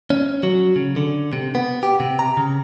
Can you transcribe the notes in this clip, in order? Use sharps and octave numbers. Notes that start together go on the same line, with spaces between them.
C#4
F#3
C#3
D3
C3
B3
G4
C3
A#5
C#3